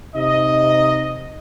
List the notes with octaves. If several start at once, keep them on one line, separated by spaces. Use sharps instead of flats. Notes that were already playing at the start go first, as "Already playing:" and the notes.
C3 D#4 D#5